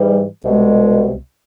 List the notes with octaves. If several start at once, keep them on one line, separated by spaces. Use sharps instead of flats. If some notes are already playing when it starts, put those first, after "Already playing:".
Already playing: G#2 E3 G3
C2 B2 G#3